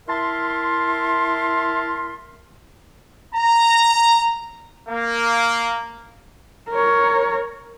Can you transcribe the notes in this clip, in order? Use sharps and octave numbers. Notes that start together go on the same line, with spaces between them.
E4 A#4 E5 A5 C6
A#5
A#3
A#4 C#5